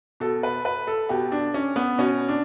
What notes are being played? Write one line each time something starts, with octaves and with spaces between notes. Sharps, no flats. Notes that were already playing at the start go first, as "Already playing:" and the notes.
B2 A4
B4
B4
A4
B2 G4
D4
C#4
B3
B2 C#4
D4